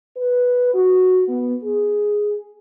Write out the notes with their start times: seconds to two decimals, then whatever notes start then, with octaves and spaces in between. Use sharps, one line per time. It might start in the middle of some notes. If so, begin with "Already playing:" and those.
0.16 B4
0.74 F#4
1.28 B3
1.64 G#4